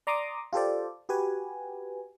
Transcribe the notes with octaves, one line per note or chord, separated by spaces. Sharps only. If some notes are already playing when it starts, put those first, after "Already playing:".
D5 A#5 C6 D6 D#6
F4 G4 A4 C5 D5
F#4 G4 B4 G#5